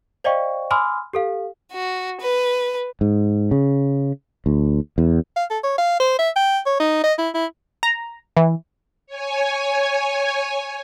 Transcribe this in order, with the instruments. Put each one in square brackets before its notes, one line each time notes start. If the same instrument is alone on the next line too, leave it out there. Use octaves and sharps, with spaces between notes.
[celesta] C5 D5 D#5 F5 G5 C#6
G#5 B5 C6 D6 E6 F6
G4 A4 F5
[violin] F#4
B4
[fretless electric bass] G#2
C#3
D2
E2
[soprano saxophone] F5
A4
C#5
F5
C5
E5
G5
C#5
D#4
D#5
E4
E4
[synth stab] A#5
E3
[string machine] C#5 G#5